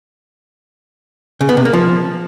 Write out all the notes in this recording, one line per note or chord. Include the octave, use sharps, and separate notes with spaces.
C#3
B3
C3
A#3
F3